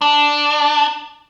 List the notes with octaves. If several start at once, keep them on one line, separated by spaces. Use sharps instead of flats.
D4